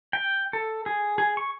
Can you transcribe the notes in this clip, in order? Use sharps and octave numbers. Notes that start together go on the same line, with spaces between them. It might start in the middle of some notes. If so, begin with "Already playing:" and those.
G5
A4
G#4
G#4
C#6